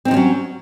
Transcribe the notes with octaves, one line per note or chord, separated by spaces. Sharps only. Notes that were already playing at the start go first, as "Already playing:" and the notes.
F3 F#3 C4 C#4 D#4